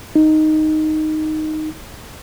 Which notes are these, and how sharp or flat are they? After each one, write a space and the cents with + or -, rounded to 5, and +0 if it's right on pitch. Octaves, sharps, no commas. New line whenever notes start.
D#4 -5